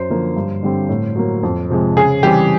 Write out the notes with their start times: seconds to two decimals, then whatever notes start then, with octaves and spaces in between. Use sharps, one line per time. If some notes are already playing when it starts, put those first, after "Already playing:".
Already playing: F#2 C5
0.09 D3 F3 A#3
0.36 G2
0.63 D3 G3 C4
0.89 A2
1.16 F#3 A#3
1.43 F2
1.70 C3 F3 G#3
1.97 C#3 G#4
2.23 E3 G3 C4 G4